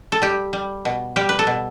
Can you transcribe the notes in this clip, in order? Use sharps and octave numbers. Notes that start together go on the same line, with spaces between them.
A4
G3 G4
G3
B2
G3 G4
B4
A4
B2